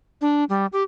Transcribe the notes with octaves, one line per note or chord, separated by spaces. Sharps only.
D4
G3
G4